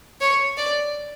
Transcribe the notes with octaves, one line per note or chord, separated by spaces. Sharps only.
C#5
D5